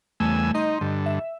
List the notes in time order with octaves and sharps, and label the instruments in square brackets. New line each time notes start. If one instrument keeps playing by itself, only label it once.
[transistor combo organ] E2 G#5 E6 [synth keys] C#3 G3 A3
[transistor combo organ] D#4 [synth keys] D#5 C6 G6
[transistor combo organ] G2 D3
[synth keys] E5